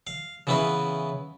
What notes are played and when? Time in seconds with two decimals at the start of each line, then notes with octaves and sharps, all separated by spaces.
0.07 F5
0.47 C#3 E3 B3 C#4 E4 B4